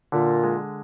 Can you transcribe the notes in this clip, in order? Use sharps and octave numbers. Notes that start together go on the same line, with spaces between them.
A#2 D3
G#3